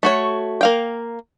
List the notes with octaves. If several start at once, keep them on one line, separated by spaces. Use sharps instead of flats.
A3 F#4 C#5
A#3 F5 G5